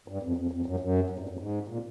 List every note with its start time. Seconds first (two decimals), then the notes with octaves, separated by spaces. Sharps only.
0.08 G2
0.23 F2
0.37 F2
0.52 F2
0.66 F#2
0.80 F#2
1.10 F#2
1.19 G2
1.29 F#2
1.39 G#2
1.68 A#2